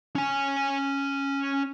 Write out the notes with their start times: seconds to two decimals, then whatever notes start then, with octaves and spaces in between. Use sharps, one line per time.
0.16 C#4 G#5